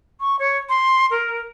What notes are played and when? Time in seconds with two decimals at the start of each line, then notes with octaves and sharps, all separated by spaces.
0.20 C#6
0.39 C#5
0.69 C6
1.11 A#4